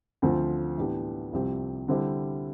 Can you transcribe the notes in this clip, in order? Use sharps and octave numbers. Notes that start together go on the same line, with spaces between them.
D2 D3 F3 C4 F4
A2 E3 B3 D4 G4
C2 C3 F3 C4 G4
D3 G3 C4 E4 G4